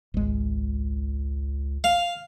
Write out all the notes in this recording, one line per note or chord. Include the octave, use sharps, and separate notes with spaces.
G#1 C#2 G#3
F5